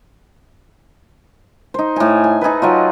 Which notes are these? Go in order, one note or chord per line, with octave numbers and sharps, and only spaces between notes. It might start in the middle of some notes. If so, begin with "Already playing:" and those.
D#4 C5
A2 G#5
G#5
D#4 G#4 A4 B4
F#3 D#4 F4